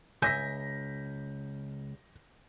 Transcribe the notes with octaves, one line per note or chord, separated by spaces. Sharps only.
C#2 E5 G#5 G6 A#6 B6